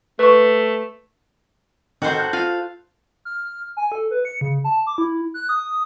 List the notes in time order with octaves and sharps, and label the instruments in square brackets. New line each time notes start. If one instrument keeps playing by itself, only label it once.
[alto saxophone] A3 [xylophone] B4 C#6
[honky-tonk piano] D#3 G6 [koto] F#4 A4 C5
[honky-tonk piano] F#6
[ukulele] F4 [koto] F5
[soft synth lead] F6
G#5
A4
B4
C#7
C#3
A5
D6
E4
F#6
D#6